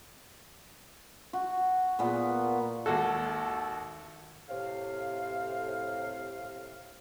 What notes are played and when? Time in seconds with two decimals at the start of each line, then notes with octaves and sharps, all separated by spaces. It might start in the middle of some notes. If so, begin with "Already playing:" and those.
1.33 F#4
1.99 A#2 B3
2.86 G#1 D#2 F#4 A4
4.49 A2 C3 F5